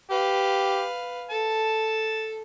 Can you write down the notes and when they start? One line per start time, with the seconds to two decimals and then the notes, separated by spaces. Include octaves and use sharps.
0.11 G4 B4 F5
1.31 A4 A5